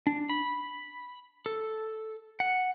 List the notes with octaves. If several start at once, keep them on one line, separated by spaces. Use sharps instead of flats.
D4
B5
A4
F#5